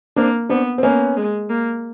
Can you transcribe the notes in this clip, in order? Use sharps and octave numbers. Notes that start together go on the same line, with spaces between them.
A#3 C4 D4
B3 C4 D4
C4
A#3 B3 C#4
G#3
A#3